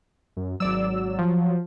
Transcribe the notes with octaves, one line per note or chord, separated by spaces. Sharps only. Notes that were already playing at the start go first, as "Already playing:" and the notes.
F#2
G#1 F#3 D5 E6
F3